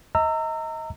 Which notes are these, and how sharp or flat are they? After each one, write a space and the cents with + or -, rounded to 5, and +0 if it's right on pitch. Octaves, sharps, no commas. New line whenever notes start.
D#5 +30 A#5 -30 E6 +15